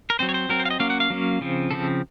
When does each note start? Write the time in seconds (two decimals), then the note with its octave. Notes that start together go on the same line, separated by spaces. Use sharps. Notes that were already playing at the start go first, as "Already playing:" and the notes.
0.10 A#4
0.19 F#3 C4 C5
0.29 C#5
0.34 C5
0.49 F#3 C4 A#4
0.60 C5
0.65 F5
0.70 D#5
0.80 F#3 A#3 C#4 F5
0.90 F#5
1.00 F5
1.10 F#3 A#3 C#4
1.41 C#3 F3 C4
1.71 C#3 F3 C4 A4